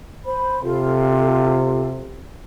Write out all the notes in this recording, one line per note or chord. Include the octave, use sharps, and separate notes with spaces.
C5 B5
C3 F4 A4